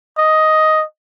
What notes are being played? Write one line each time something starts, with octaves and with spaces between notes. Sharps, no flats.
D#5